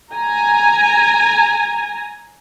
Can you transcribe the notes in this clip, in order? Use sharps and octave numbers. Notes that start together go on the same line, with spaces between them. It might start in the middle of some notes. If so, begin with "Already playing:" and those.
G#5 A#5